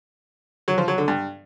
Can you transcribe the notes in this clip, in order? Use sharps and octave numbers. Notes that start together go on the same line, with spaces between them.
F#3
F3
F#3
D3
G2